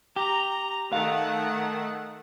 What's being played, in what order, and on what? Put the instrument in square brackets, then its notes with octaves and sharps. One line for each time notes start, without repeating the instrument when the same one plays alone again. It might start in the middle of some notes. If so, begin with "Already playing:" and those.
[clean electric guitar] G4 [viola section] A#5
[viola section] D#3 A3 F#5 [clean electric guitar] F5